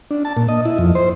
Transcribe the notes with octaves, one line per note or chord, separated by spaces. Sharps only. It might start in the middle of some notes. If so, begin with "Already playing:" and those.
D4
A5
A#2
D#5
E4
F2
C5